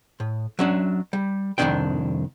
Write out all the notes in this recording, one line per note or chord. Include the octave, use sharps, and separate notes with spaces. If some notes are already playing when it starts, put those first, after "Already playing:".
A2
F#3 C#4 D4
G3
C2 F2 A#2 D#3 D4 G5